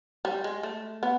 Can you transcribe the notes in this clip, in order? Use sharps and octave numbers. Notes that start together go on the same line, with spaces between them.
G3
G#3
A3
B3